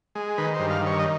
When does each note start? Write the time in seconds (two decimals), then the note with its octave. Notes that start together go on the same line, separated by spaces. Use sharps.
0.15 G#3
0.38 D#3 B4
0.54 G2 C5
0.70 F5
0.81 D#3
0.87 C#5
0.99 D#5